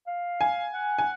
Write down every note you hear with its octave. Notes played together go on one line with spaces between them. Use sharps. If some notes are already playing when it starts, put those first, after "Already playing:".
F5
G#5
F#5
G#5